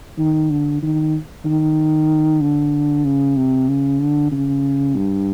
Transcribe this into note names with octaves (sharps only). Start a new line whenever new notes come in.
D#3
D3
D#3
D#3
D3
C#3
C3
C#3
D3
C#3
G2